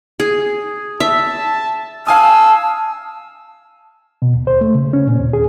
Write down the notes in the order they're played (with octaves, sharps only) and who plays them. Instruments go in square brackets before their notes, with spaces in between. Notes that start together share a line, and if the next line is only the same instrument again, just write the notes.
[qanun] G#4
[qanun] E5 [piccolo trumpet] A5
[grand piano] F5 G#5 D#6 [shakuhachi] A5 [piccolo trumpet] E6
[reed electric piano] B2
D#2
C5
A3
C#3
C#4
A#2
D#2
G#4